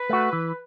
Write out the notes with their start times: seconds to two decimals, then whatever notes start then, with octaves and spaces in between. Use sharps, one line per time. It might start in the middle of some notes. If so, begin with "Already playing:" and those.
Already playing: B4
0.09 A3 F#4
0.33 E3